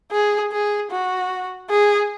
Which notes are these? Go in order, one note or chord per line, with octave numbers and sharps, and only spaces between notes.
G#4
G#4
F#4
G#4